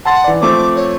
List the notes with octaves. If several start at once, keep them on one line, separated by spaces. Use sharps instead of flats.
F#5 A5 C6 A6
E3 D5
F3 A3 C4 D6
C#5